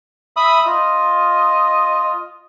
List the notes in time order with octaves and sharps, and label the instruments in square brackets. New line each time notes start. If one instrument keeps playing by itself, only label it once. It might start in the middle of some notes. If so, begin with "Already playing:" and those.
[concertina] E5 B5 D#6
[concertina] F4 [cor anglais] D#5